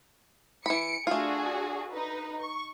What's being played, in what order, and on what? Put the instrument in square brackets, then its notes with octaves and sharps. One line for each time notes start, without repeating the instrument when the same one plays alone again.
[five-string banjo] E3 B5 [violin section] C#7 D7
[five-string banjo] A3 F4 [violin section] D4 F#4 G#4
[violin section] D#4 B4
C#6